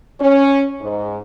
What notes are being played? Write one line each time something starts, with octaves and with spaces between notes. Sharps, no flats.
C#4
G#2